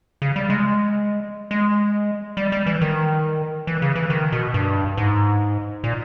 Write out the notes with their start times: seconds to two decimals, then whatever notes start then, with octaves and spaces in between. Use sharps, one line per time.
0.22 C#3
0.36 G3
0.50 G#3
1.51 G#3
2.37 G3
2.52 G3
2.66 E3
2.81 D#3
3.67 E3
3.82 C#3
3.96 E3
4.10 D#3
4.32 B2
4.54 G2
4.97 G#2
5.84 A#2